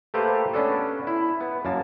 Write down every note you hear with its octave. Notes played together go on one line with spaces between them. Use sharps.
A3 A#3 G4 A4 B4 C5
B3 C#4 D4 A4
E4
B3
F#2 A#3 A5